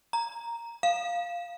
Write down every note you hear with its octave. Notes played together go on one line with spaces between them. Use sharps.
A#5
F5